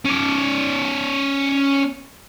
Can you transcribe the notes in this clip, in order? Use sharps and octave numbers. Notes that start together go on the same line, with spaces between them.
C#4 D5